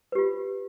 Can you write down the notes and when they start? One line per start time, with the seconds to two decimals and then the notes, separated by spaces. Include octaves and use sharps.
0.12 B4
0.15 G4
0.18 F4